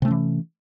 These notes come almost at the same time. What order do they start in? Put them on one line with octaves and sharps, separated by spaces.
C3 A3 C#4 E3